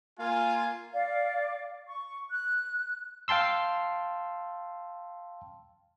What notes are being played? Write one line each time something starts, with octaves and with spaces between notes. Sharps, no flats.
A#3 F4 F5 G#5
D5 F5
C#6
F#6
F5 G5 A5 C6 E6